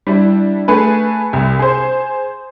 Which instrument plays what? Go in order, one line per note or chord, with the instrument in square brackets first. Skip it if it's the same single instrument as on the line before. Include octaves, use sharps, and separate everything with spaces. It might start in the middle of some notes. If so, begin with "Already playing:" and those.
[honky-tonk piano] G3 D4 E4
A3 G#4 B4
C2
G#4 C5